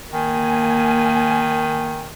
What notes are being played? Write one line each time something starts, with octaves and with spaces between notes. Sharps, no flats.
D#3 A#3 G#5